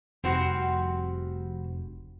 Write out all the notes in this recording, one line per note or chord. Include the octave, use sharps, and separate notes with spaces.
F1 G3 C4 F#4